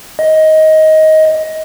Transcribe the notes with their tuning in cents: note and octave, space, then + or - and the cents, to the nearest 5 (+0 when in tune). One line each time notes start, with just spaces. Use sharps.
D#5 +15